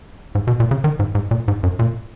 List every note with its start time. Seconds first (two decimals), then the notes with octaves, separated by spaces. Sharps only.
0.35 G#2
0.47 B2
0.60 A#2
0.71 C#3
0.84 D#3
0.99 G#2
1.15 G#2
1.31 A#2
1.48 G#2
1.63 F#2
1.79 A#2